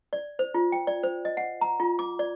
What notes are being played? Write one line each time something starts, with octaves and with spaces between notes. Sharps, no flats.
D5
C5
F4
G5
D5
C5
D#5
F#5
A#5
F4
D6
D5